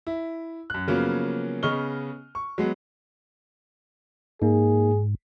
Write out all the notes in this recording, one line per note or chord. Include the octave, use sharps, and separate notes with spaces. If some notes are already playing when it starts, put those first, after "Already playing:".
E4
F#2 F#6
C#3 F3 F#3 A#3 B3 C#4
C#3 B3 D#5 C#6 F6 G7
C#6
F#3 G#3 B3
G#2 A#3 D#4 G#4